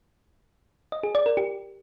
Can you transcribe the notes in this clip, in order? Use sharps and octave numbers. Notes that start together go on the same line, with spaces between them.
D#5
G#4
D5
A#4
G4